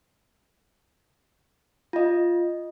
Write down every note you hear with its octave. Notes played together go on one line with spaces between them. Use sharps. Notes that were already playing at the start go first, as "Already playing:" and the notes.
F4 D#5